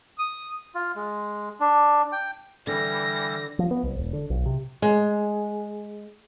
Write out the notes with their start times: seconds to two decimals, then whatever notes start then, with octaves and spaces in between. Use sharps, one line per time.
0.19 D#6
0.75 F4
0.96 G#3
1.60 D4
2.12 G5
2.67 D3 E3 G3 A#6
3.59 F3
3.71 B3
3.83 C2
3.97 E1
4.13 D3
4.30 B1
4.46 C3
4.82 G#3